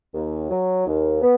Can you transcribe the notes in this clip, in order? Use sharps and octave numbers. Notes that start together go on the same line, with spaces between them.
D#2
F#3
D#2
B3